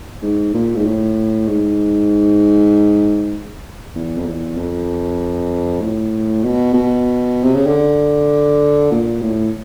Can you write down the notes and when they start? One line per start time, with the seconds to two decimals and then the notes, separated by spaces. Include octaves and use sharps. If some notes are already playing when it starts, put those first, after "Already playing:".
0.22 G#2
0.54 A#2
0.76 G#2
0.85 A2
1.47 G#2
3.95 E2
4.17 F2
4.26 E2
4.57 F2
5.81 A2
6.43 B2
6.74 B2
7.44 C3
7.54 C#3
7.67 D3
8.91 A#2
9.22 A2